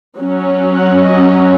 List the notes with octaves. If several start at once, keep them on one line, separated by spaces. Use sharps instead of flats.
F#3 C#4
F#5
D#5